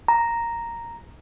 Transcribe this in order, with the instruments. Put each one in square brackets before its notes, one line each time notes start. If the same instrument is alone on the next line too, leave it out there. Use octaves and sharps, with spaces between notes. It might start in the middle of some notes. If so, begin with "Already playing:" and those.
[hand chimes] A#5